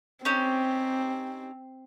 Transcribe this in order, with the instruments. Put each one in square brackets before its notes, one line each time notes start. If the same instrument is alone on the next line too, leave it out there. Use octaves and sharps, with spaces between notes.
[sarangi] C4 [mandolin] C#4 D#4 G4